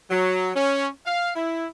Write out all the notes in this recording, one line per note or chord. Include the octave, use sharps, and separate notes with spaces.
F#3
C#4
F5
E4